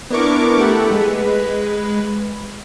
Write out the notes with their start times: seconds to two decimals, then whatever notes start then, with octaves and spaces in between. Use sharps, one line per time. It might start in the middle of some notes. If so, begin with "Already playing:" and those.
0.10 B3 D4 E4 A#4 C#6 D6
0.57 A3 E4 G4 A4 F#5
0.91 G#3 B4